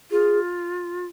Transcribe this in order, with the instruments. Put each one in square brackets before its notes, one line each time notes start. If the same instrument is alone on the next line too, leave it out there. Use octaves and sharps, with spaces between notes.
[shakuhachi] F4 [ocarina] G#4